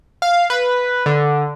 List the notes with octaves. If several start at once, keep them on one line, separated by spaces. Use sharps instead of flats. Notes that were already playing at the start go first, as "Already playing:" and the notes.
F5
B4
D3